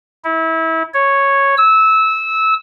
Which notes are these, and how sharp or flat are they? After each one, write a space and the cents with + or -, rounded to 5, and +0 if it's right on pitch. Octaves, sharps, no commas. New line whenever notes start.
E4 -25
C#5 -5
E6 -20